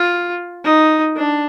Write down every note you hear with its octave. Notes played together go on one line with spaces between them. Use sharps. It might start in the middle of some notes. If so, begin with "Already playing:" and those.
Already playing: F4
D#4
D4